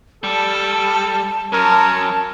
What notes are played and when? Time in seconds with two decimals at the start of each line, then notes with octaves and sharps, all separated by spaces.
0.23 G3 A4 A5
1.53 F#2 A#4 C#5 A5